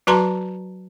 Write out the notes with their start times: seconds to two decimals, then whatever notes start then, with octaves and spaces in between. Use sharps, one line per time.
0.07 F#3 F#4 B4 A5 A#5 C6